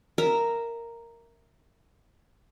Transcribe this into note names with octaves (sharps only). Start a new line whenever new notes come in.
A#4 E5 A#5